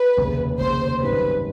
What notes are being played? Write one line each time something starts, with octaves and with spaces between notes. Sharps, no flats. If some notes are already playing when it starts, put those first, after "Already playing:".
Already playing: B4
F1 D#2 C#3
F1 D#2 C#3 C5
G#1 F#2 D#3 G3 C4 B4